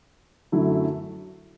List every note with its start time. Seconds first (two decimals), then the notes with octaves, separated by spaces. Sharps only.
0.52 F#2 D3 F#3 A3 E4